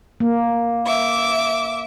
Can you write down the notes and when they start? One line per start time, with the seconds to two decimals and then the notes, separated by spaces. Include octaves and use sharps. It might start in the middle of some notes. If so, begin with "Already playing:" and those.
0.20 A#3
0.86 E5 D6